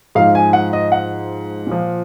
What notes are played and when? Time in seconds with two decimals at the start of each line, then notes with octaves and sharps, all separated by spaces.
0.15 G#2 F3 F5
0.35 G#5
0.53 F#5
0.73 D#5
0.92 F#5
1.67 A#2 F3